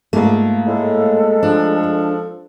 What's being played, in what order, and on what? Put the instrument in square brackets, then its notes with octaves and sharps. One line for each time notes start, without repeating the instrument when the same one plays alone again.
[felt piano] G#2 A3 [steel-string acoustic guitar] A#3 F4
[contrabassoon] A2 [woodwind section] G#3 A4
[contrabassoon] F3 [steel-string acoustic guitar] D4